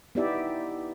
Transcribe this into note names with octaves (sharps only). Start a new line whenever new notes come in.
B3 D#4 E4 G4 D5 E5